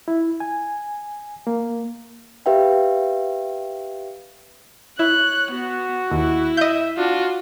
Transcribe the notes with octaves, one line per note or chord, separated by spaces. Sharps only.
E4
G#5
A#3
G4 B4 E5 F5 G5
E4 C#5 F#6
B3 F#4
D#2 E4
D#5 E5 G6
D4 F4 F#4